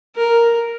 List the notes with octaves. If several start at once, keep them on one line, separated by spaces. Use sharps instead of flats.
A#4